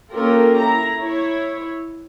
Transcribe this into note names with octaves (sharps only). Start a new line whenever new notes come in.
A#3 C#4 F4 G4 A4 A#4
E4 A#5
E4 C#5